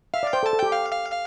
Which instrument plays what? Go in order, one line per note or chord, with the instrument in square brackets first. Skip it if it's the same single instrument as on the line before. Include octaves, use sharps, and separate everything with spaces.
[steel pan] E5 [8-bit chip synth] F5
[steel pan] D5
[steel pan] C5 [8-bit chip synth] G5
[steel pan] A4
[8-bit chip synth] A5
[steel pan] A4
[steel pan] G4 [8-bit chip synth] G5
[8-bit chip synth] F5
F5
F5